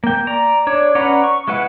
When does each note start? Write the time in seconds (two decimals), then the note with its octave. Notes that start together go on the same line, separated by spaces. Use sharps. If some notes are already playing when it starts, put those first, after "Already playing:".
0.04 A#3 G5
0.27 D5 A#5
0.67 D4 C#5 D5
0.95 C#4 B4 D5 F#5 A#5
1.24 C#6
1.48 G#3 E4 B4 F#5